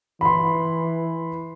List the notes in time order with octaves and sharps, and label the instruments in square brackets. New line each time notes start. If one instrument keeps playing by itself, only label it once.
[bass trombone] E3 [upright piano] B5 C6